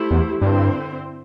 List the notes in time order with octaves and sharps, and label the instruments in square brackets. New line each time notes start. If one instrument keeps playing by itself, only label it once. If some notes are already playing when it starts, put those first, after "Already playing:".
Already playing: [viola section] A3 E4 G4 C5
[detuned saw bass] E2
[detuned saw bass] G2 [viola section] D3 C4 E4 C5